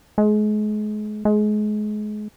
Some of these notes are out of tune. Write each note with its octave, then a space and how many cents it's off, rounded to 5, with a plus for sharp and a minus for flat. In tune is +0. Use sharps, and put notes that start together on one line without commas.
G#3 +35
G#3 +30